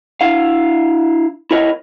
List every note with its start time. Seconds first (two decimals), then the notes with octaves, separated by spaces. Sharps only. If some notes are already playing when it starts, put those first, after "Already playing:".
0.21 D4 E4 F5
1.51 E4 A#4 C#5 D#5